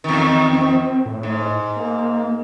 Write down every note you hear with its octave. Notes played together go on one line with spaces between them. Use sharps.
E2 D#3
C4
A2
G#2
A#3